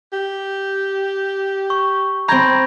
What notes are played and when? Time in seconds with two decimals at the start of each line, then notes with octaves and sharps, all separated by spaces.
0.13 G4
1.70 C#6
2.28 C4 A#5 B5 G6 G#6